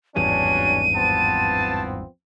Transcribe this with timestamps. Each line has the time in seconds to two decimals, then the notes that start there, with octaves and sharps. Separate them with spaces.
0.16 G#1 E2 G2 F#3 C#4 D4 D#7
0.96 F3 B3 C4 A5